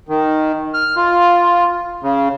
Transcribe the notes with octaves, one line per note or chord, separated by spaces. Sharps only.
D#3
F6
F4
C#3